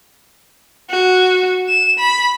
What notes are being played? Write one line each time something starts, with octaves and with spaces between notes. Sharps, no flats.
F#4
E7
B5